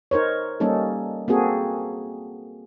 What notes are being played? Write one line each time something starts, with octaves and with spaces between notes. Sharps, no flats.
D#4 A#4 C5 C#5
G3 A#3 C#4 D#4 A4
A#3 C4 F#4 G#4 A4